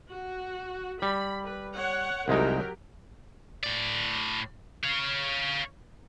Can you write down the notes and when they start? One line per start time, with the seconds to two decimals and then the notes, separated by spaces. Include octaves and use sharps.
0.11 F#4
1.02 G3 B5
1.46 B4
1.75 C#5 F#5
2.28 C2 F#3 G#3 D#4 G4 A#4
3.64 A2 D5
4.84 C#5 F5